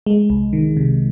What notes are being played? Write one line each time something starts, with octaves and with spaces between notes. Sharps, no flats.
G#3
C2
D#3
C3